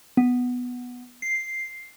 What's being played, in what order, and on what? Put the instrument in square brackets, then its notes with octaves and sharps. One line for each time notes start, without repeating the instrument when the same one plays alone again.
[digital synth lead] B3
C7